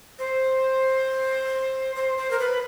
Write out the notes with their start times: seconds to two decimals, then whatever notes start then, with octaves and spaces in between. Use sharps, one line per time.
0.19 C5
1.96 C5
2.18 C5
2.31 A#4
2.40 B4